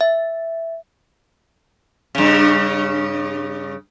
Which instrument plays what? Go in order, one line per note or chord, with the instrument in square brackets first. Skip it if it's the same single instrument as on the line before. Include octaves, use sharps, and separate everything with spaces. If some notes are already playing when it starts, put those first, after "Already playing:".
[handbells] E5
[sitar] G2 C#3